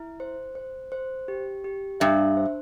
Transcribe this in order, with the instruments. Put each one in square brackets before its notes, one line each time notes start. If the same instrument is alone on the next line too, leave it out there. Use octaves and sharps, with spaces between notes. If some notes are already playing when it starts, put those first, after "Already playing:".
Already playing: [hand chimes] E4
C5
C5
C5
G4
G4
[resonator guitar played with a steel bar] G2 [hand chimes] E5
[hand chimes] C5